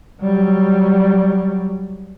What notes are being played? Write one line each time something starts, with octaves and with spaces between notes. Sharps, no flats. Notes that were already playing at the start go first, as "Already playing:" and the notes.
F#3 G3